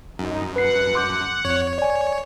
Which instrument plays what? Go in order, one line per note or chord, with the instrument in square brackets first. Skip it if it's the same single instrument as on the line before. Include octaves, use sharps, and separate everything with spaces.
[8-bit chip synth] F#2 [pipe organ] D#4
[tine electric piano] B4 C7 [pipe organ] F#5
[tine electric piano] C6 D6 G6
[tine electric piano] F2 [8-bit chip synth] C#5
[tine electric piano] D5 G#5